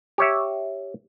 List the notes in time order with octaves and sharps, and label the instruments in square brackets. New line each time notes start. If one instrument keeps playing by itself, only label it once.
[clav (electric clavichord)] G4 C#5 E5